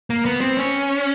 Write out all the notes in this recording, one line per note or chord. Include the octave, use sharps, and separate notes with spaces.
A#3
B3
C4
C#4